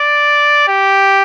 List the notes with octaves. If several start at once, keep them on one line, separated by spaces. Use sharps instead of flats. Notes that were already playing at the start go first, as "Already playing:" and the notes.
Already playing: D5
G4